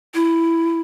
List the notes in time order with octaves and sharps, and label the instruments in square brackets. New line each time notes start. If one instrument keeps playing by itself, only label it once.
[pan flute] E4